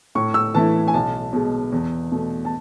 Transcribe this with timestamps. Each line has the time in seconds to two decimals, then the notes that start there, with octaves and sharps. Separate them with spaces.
0.15 A2 C#6
0.34 E6
0.54 E3 A3 E4 A5
0.88 G#5
0.94 B1 A5
1.33 B2 G#3
1.73 E2
2.12 B2 A3
2.45 A5